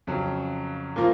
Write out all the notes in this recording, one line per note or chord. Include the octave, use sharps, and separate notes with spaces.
F2 C#3 F#3
A#2 F3 A#3